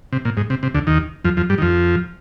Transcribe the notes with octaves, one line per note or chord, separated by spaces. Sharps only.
C3
A#2
G#2
C3
C3
D2 D3
D#2 D#3
F2 F3
F2 F3
G2 G3
D#3
F2 F3